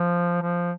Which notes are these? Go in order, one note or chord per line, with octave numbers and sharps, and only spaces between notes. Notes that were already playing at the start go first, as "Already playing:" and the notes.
Already playing: F3
F3